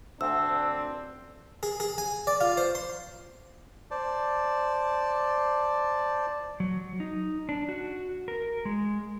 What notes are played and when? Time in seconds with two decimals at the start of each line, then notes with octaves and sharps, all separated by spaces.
0.21 D2 C4 D4 E6
1.63 G#4
1.80 G#4
1.98 G#5
2.27 D5
2.41 F4
2.57 C5
2.75 C6
3.91 C5 D5 A5
6.60 F#3
7.00 D#4
7.49 D4
7.69 F#4
8.28 A#4
8.65 G#3